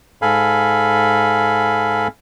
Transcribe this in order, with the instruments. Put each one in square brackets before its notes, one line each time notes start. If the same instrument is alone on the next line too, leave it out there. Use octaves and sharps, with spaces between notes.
[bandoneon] G#2 A4 F5 G#5 B5